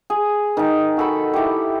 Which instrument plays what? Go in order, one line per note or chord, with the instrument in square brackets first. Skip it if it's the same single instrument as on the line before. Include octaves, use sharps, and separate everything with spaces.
[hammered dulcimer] G#4
D#3 D#4
F#4 A4 B5
E4 G4